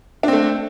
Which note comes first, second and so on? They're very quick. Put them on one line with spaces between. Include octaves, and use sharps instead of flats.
D4 C4 A3